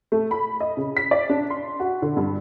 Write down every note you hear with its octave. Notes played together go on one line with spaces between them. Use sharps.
A3
B5
D#5
C#3
B6
D5
D4
C6
F#4
D3
G2